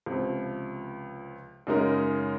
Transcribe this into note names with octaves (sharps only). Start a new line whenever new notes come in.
C#2 C3 F3
F#2 C#3 G#3 D#4 A#4